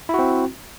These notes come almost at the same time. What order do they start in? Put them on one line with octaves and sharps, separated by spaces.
E4 F#4 C4